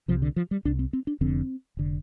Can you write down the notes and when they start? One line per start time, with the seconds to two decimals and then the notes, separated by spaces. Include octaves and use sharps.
0.08 C2 C3 F3
0.22 D3
0.36 F3
0.51 G3
0.65 C2 C3 D4
0.79 C4
0.93 C4
1.07 D4
1.21 F1 F2 D3 C4
1.77 F1 D3